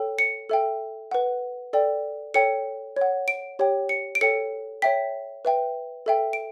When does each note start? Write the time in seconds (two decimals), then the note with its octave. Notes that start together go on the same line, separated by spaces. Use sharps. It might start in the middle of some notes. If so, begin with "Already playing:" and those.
Already playing: A4 C#5 G5
0.19 C#7
0.49 A4 E5 G5
1.11 B4 F#5
1.73 A4 D5 G5
2.34 A4 C#5 G5 C#7
2.96 C#5 F#5
3.28 D7
3.59 G4 C#5 G5
3.89 C#7
4.15 D7
4.21 A4 C#5 G5 C#7
4.82 C#5 E5 G5 B6
5.45 B4 E5 G5
6.06 A4 E5 G5
6.33 D7